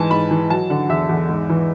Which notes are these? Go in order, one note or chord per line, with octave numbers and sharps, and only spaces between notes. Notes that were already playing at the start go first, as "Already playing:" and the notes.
Already playing: G#2 E3 G#5 A5
G#2 B5
E3
F#3 A5
D3 F#5
E2 E5
E2
G#2
E3